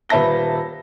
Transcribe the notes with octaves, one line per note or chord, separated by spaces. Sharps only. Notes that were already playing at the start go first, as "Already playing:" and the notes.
D#1 B4 E5 A5 A#6 G7